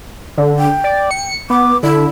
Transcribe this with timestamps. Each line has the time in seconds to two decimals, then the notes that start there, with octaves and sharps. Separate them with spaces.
0.37 D3
0.59 G5
0.84 D5
1.11 C#7
1.50 B3 D6
1.83 D3 E4